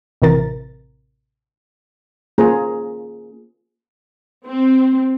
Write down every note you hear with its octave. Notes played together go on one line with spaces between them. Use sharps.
A1 C3 E3 A#4 A6
A#3 C#4 F4 G#4 C5 A#5
C4